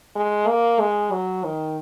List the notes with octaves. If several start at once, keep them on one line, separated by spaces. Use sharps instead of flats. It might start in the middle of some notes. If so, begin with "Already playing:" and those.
G#3
A#3
G#3
F#3
D#3